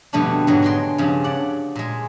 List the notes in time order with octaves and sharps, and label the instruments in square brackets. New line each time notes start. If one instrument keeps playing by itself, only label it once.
[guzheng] F2 B2 D3 G3 A3 D4
G#2 D3 F#3
G#3 G5 C6
G2 C#3 F3
D5 F#5
A#2 G#3